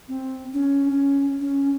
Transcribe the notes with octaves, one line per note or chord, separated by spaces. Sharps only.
C4
C#4
C#4
C#4